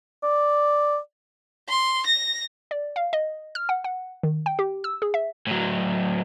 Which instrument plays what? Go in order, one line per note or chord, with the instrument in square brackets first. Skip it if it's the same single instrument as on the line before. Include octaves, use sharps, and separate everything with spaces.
[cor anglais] D5
[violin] C6
A#6
[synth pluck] D5
F5
D#5
F6
F#5
F#5
D#3
G5
G4
E6
G#4
E5
[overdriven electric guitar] A2 F#3